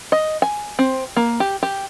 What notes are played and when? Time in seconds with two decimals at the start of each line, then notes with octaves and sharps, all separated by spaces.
0.12 D#5
0.42 G#5
0.79 C4
1.16 A#3
1.40 G4
1.63 G4